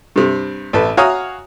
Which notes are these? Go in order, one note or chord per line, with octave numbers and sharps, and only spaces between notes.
G2 C3
A1 A4 B4
F#4 C#5 F5 G#5 A#5 D#6